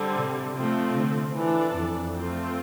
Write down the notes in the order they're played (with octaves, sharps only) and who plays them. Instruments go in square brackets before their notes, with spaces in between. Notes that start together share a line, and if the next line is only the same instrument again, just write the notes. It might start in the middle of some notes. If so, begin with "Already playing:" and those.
Already playing: [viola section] D3 G3 C4
[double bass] C3
[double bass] C3 [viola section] F3 A3 C4
[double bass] D3
[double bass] E3 [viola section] D4 A4 D5
[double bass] F2
[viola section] A3 C4 F4